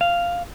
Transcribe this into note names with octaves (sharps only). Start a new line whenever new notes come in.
F5